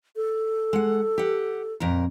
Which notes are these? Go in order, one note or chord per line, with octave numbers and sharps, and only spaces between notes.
A4
G#3 F#5
G4 F#5
F2 A#2 A#4